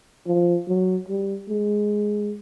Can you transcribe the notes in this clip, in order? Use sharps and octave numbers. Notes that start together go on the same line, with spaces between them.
F3
F#3
G3
G#3